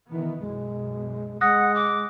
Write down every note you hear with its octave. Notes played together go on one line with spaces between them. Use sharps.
B2 D#3 E3 B3
B1 F#2 B2 G#3
G#3 F#5 D#6 F#6 A#6
D6